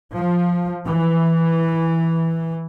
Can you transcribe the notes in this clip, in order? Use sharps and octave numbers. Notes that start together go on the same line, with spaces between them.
F3
E3